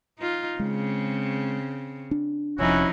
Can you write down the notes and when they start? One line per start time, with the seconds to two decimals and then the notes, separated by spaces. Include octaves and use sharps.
0.19 D#4 F4
0.59 C#3 G#3 C4
2.11 D4
2.59 F1 F2 F3 C#4 D#4 E4 F#4